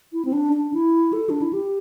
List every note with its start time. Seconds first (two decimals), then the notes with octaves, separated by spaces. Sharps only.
0.13 E4
0.25 C4
0.33 D4
0.53 D4
0.74 E4
1.13 A4
1.30 D4
1.42 E4
1.53 G4